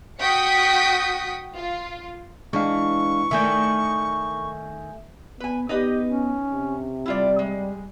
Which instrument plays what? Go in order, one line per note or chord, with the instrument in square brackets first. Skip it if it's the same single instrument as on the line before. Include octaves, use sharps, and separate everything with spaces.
[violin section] F#4 G5 D#6 B6 C#7
F4
[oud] E3 [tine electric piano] G#3 D4 F5 [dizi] C#6
[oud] D#3 A3 D4 [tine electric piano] E5 G#5 G6
[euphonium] B3 [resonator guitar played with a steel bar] B4 G#5
[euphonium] B3 [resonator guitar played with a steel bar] D#4 B4 D#5 [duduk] G4
[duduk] C#4
[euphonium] C3
[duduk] G3 [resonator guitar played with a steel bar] E4 F4 D5
[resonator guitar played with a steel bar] G#3